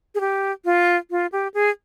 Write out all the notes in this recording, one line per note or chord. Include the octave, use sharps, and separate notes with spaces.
G#4
G4
F4
F4
G4
G#4